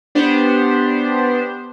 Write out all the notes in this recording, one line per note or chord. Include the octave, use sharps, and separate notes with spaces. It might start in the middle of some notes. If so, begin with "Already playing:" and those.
B3 D4 G4 C5